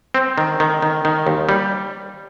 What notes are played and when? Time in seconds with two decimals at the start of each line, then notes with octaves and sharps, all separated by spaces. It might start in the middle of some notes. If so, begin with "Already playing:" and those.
0.14 C4
0.38 D#3
0.60 D#3
0.82 D#3
1.05 D#3
1.27 D#2
1.49 G3